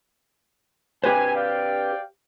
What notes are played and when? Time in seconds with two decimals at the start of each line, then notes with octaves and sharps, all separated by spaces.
1.04 G4 B4 C5 G#5
1.36 D5 F5 G5